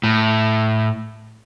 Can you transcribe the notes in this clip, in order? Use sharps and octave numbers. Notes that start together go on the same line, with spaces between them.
A2